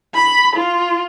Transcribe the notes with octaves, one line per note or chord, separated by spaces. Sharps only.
B5
F4